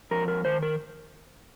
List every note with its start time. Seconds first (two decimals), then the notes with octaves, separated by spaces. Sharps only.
0.11 F2 A#4
0.28 A#4
0.45 D#3 C5
0.62 A#4